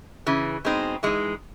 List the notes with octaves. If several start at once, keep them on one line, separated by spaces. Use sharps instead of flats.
C#3 E3
B2 G#3 C4 D#4
E3 G#3 D#4